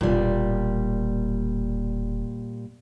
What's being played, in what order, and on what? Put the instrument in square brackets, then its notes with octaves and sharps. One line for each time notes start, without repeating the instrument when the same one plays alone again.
[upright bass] E1 [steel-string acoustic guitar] A#2 G3